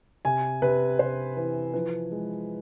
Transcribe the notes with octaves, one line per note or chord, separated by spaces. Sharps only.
C3 G#5
C3 B4
C3 C5
E3 B4
F3 B4
G#3